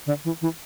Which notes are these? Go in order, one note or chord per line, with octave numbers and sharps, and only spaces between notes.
D3
E3
E3